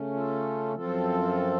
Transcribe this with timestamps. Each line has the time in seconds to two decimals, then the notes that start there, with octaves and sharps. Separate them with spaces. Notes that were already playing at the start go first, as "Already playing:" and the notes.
Already playing: C#3 A3 C#4
0.14 F4 A4
0.75 F#2 F3 C4 F4 A4